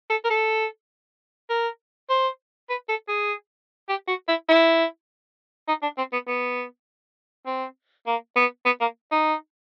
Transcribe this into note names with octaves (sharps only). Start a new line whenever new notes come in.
A4
A#4
A4
A#4
C5
B4
A4
G#4
G4
F#4
E4
E4
D#4
D4
C4
B3
B3
C4
A#3
B3
B3
A#3
D#4